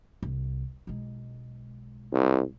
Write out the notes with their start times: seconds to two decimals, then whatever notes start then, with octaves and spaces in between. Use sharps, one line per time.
0.23 C2
0.87 B1 G#3
2.12 C2